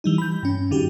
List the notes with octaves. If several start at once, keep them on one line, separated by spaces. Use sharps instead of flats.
E3 G3 D#4
B5 G6
G2 C#4
F#2 D3 D#4 F#4 G4